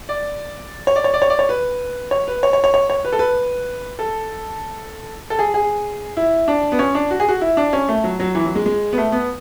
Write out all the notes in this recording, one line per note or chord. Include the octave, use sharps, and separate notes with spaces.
D5
C#5
D5
C#5
D5
C#5
D5
C#5
B4
C#5
B4
C#5
C#5
C#5
C#5
C#5
B4
A4
B4
A4
A4
G#4
G#4
E4
D4
B3
C#4
D4
F#4
G#4
F#4
E4
D4
C#4
A3
F#3
F#3
E3
F#3
G#3
G#3
B3
A3
B3